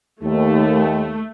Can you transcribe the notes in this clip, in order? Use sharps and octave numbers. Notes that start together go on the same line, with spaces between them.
D#2 A3